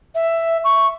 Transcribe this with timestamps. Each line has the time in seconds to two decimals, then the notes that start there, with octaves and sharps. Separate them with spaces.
0.15 E5
0.64 C#6